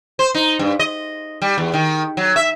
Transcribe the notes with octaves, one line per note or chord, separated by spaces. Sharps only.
C5
D#4
G2
D#5
G3
E2
D#3
F#3
E5